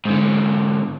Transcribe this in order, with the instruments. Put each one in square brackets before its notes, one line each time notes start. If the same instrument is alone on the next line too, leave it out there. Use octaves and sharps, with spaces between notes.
[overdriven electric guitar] G#2 D3